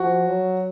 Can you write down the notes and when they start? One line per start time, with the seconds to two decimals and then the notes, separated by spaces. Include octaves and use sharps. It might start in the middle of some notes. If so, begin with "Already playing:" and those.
Already playing: F3 F#4
0.27 F#3